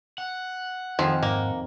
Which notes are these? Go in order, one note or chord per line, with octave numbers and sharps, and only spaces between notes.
F#5
F2 D#3 F3 G#4
G#2 A#3